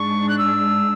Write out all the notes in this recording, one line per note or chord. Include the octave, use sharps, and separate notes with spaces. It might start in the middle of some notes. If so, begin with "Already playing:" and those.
Already playing: G#2 G#3 D4 C#6
F#6
E6